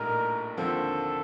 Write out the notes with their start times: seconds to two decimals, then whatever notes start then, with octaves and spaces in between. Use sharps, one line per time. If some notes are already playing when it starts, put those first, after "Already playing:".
Already playing: A#1 A2 G3 A#3 D#4 A#4
0.57 D#2 D3 F3 C4 A4